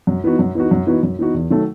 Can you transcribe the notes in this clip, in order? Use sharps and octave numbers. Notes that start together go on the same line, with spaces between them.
F#2
E3 B3 D#4 F#4
F#2
E3 B3 D#4 F#4
F#2
E3 B3 D#4 F#4
F#2
E3 B3 D#4 F#4
E2
D#3 F#3 A3